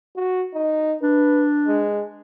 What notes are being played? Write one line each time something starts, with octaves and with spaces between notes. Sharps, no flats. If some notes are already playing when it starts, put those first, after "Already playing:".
F#4
D#4
D4 B4
G#3